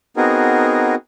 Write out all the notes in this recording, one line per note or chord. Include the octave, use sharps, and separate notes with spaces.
B3 C4 D#4 F#4 G#4 A#4